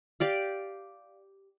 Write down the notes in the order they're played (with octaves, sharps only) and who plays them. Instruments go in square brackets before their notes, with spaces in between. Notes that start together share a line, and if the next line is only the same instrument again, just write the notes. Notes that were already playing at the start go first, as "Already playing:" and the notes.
[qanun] G4 D5 F5